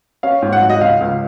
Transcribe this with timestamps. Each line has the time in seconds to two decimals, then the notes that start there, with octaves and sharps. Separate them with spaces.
0.23 C#4 F5
0.42 G#2
0.53 F#5
0.62 F#3
0.70 D#5
0.81 C#2 F5
1.01 C#2